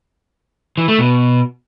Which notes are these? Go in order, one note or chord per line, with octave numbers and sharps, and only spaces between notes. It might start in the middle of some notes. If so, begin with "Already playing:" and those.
E3
A3
B2